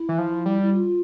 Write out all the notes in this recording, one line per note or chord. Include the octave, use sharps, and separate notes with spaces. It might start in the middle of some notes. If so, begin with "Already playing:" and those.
Already playing: E4
E3
F3
G3
E4
F4